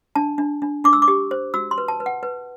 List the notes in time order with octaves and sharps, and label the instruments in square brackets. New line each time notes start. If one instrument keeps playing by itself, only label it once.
[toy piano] D4 A5
D4
D4
D4 D6
E6
D6
G4
C5
F#4 E6
C6
B4
A5
B4
F#5
B4